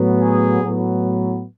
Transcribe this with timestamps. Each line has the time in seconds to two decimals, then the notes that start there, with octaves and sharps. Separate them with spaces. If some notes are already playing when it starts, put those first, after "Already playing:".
Already playing: A2 F#3 B3
0.21 G#4
0.62 A2 F#3 B3